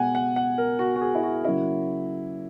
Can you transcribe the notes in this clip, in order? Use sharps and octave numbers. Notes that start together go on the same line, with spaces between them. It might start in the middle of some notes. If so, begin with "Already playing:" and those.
Already playing: B2 G#3 B3 F#5 G#5
F#5
F#5
A#4
F#4
F#4
G#4
E4
F#4
C#3 F#3 A#3 C#4 E4